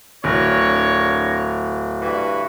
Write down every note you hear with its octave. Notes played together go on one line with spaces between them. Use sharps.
D1 D4 A#4 C#5
G2 E3 F#4